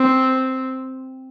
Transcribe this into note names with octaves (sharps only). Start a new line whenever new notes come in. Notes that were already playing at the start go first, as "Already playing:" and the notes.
Already playing: C4